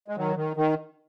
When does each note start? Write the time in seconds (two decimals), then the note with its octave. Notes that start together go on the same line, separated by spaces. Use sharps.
0.08 G#3
0.17 D#3 F#3
0.36 D#3
0.57 D#3